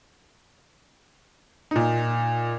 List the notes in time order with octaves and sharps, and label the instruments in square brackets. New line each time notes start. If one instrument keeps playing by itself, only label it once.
[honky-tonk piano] A#2 D#4